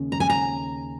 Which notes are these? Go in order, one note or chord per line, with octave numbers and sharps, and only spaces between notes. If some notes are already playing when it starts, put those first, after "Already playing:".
Already playing: D#2 C#3 C#4
A#5
G#5
A#5